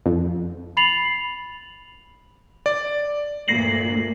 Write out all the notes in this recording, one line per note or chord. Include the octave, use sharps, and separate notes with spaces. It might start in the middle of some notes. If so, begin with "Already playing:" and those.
F2
B5 A6 C7 F7 F#7
D5
D2 G2 A#2 A#6 C7 F#7